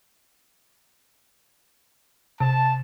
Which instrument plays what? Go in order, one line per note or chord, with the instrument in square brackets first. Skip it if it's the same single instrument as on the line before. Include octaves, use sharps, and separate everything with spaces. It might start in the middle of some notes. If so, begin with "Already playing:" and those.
[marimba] C3 [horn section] A5